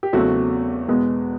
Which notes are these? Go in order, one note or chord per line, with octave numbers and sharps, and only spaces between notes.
G4
E2 C#3 F#3 A3 C4 F#4
E2 B2 G#3 B3